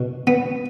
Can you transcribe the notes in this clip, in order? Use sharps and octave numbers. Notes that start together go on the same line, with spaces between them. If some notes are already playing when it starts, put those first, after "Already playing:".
Already playing: B2
B3